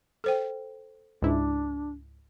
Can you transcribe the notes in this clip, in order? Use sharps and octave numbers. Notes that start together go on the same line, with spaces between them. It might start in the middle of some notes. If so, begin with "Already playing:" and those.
A4 C5 G5
C#2 G#2 D4 E4